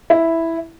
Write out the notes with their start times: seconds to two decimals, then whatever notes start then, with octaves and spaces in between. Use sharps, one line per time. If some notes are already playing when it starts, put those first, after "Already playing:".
0.10 E4